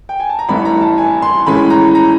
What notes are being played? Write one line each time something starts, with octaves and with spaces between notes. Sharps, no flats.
G5
G#5
A5
A#5
A1 G2 E3 A3 B5
A#5
A5
G#5
C6
A2 E3 G#3 C#4 B5
A#5
A#5